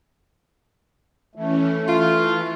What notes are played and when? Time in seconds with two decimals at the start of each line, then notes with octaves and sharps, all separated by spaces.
1.35 E3 A3 C#4
1.88 E3 F4